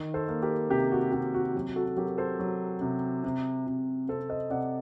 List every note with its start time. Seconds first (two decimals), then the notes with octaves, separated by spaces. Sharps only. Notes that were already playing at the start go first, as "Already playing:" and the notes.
Already playing: D#3
0.14 A4 C5
0.29 A#3
0.42 G4 A#4
0.70 C3 G4
0.92 F#4
1.12 C3 G4
1.34 F#4
1.54 F#3 G4
1.76 F#4 A4
1.97 F#3 G4 A#4
2.18 A4 C5
2.39 F#3
2.81 C3
3.24 C3
3.67 C3
4.08 C3 A4 C5
4.30 C5 D#5
4.50 C3 D5 F#5